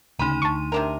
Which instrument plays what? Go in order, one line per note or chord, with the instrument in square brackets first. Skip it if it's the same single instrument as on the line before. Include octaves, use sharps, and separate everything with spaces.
[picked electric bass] D2 C#3 [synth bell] D#4 C6 D#7 [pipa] B5
[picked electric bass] D2 [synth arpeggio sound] A5 C#6
[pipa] C3 D4 A#4